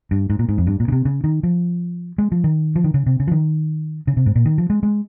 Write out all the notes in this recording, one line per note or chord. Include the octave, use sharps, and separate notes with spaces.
G2
G#2
A#2
G#2
F2
G2
A#2
C#3
C3
C#3
D#3
F3
G#3
F3
D#3
F3
D#3
C#3
C3
C#3
F3
D#3
C#3
C3
G#2
A#2
D#3
F3
G#3
G#3